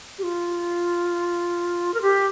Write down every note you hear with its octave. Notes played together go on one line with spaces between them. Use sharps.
G4
F4
A#4
G4